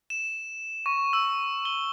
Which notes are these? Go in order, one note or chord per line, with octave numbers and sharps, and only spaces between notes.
E7
C#6
E6
G7